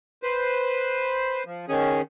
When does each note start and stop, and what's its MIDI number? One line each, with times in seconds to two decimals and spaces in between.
0.23 1.43 71
0.23 1.43 72
1.46 1.66 53
1.69 2.01 51
1.69 2.01 61
1.69 2.01 68